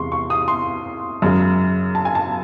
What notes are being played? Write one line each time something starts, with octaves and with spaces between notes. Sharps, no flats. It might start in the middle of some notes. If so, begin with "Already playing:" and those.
Already playing: E2 C3 E3 G#3 C6 C#6
C#6
D#6
C6
F#2 C#3 G#3
A5
G#5
A5